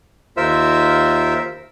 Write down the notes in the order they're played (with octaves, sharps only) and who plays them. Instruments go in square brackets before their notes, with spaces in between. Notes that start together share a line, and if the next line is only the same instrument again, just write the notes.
[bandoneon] D#2 F4 A#4 C5 E5 E6